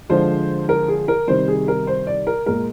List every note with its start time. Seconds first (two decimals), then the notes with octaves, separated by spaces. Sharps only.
0.09 D3 F3 G#3 C5
0.69 A#4
0.88 G#4
1.08 A#4
1.27 C3 D#3 G3 C5
1.48 G#4
1.68 A#4
1.87 C5
2.07 D5
2.27 A#4
2.46 A#2 G#3 A#4